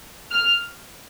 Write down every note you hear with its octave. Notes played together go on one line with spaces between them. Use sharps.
F6